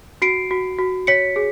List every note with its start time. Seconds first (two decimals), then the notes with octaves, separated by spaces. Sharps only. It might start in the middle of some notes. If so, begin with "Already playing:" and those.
0.22 F#4 C7 D7
0.51 F#4
0.79 F#4
1.07 C#5 B6 C#7
1.36 G#4